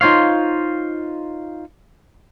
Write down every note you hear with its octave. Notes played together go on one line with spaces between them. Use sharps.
D#4 F4 C5 C#5 F5